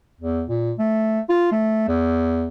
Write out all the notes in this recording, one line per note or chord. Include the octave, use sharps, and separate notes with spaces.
E2
A#2
A3
F4
A3
E2